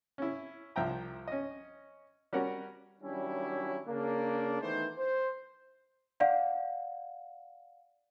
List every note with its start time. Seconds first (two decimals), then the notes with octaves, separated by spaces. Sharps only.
0.18 C#4 E4
0.76 C2 F3 E5 G5 A#5
1.28 C#4 D#5
2.33 G3 C#4 F#4 A#4 F#5
3.02 D#3 F#3 G3 C#4 D4 E4
3.88 C#3 A#3 D4
4.61 D#3 E3 A3 B3 D#4 C5
4.98 C5
6.20 D5 F5 F#5